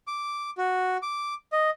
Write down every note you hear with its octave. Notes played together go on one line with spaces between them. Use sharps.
D6
F#4
D6
D#5